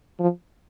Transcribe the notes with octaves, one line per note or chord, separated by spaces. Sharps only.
F3